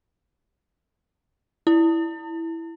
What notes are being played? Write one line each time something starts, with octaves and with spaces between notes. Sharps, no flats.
E4